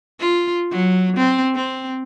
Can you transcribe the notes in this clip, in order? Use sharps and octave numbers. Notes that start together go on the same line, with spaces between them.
F4
F#3
C4
C4